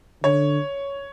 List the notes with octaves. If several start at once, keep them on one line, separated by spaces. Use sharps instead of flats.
D3 C#5